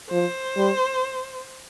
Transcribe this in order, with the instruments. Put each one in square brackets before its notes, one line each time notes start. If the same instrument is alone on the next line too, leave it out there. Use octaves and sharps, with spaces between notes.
[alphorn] F3 [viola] C5
[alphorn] G3